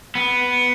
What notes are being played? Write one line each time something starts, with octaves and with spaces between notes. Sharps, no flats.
B3